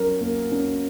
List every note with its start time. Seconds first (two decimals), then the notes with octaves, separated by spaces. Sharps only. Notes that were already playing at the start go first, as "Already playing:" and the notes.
Already playing: F#3 C#4 A#4
0.21 A#3
0.52 C#4